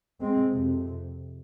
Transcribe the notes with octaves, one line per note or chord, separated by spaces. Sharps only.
G#3 C4
F2 C3